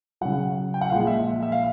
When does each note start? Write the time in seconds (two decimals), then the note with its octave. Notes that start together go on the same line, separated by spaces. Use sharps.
0.21 C#3 F#3 F#5
0.74 G5
0.81 F#5
0.90 A#2 F3 G#3 F5
1.07 E5
1.42 E5
1.52 F5